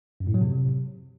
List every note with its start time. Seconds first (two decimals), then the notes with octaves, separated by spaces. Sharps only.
0.20 F#2
0.27 A2
0.34 F#3
0.41 C3